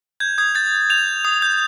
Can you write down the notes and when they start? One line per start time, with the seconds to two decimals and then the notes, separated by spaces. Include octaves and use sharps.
0.20 G6 G#6
0.38 D#6 G#6
0.55 G6 A6
0.72 G6
0.90 G6 F7
1.06 G6
1.25 D#6
1.42 G6